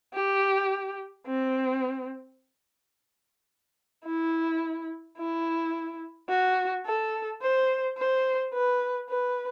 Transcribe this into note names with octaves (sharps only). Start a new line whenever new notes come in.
G4
C4
E4
E4
F#4
A4
C5
C5
B4
B4